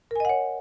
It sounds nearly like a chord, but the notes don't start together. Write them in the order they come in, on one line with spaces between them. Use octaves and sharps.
A#4 G#5 D#5 F#5 C#5